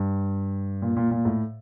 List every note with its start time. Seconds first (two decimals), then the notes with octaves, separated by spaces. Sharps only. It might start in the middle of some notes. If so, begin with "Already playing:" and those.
Already playing: G2
0.82 A#2
0.97 A#2
1.11 A#2
1.25 A2